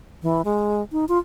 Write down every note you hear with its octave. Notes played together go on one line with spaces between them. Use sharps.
E3
G#3
D#4
F4